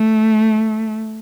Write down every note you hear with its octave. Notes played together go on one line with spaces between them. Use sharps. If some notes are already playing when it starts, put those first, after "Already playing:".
Already playing: A3